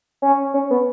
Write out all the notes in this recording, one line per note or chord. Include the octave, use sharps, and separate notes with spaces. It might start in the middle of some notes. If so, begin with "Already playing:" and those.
C#4
C#4
B3